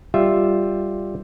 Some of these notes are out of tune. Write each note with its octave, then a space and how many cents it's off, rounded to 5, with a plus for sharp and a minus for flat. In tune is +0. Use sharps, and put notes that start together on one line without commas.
G3 +0 F4 +0 E5 +0